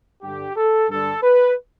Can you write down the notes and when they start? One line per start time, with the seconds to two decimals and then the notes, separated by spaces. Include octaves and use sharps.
0.22 G2 D3 G4
0.56 A4
0.89 G2 D3 A4
1.23 B4